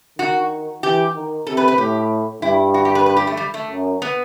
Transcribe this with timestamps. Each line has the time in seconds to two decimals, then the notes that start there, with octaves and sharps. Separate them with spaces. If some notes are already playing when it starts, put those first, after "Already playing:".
0.19 D#3 F#4
0.83 E3 G4
1.15 D#3
1.47 C3 A4
1.57 B4
1.68 B4
1.78 A2 G4
2.42 G2 E4
2.74 F#4
2.85 G4
2.95 B4
3.06 B4
3.17 G4
3.27 A3
3.37 G3
3.54 A3
3.70 F#2
4.02 B3